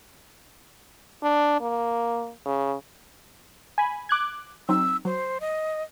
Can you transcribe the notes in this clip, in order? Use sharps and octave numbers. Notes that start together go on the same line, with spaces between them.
D4
A#3
C#3
G#5 B5
D6 F#6 G#6
F#3 C4 D#4 E6
F#3 C5
D#5